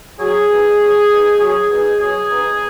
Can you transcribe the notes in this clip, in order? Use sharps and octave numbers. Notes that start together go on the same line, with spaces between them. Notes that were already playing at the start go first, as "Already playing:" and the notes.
F#3 G#4
B3 D#4
F#3
B3 D#4
F#3 G#4
B3 D#4
F#3 G#4
B3 D#4